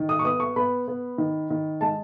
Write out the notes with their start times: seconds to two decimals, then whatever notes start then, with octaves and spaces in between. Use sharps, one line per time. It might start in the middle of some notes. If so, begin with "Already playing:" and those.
Already playing: D#3
0.09 D#6
0.19 C#6
0.25 B3 D#6
0.40 C#6
0.56 B3 B5
0.88 B3
1.18 D#3
1.50 D#3
1.81 G#3 A5